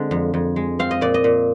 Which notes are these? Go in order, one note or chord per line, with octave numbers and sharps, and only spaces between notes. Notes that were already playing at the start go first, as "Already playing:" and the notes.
Already playing: D3 G#3 C4
F2
F2
G#3
C4 F5
D#5
A#2 D5
D#5
A#2